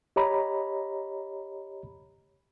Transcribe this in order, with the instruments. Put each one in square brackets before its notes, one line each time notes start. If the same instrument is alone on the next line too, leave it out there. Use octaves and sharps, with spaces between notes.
[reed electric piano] G4 C#5 D#5 A#5 B5